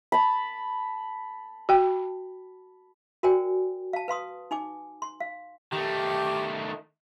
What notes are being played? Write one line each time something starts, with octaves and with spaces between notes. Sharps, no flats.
A5 B5
F#4 G5
F#4 A#4 C5 D5 G5 G#5
F5 A5
B4 F5 C6 D#6
D#4 G#5 D6
C6
F5
D#3 A3 G4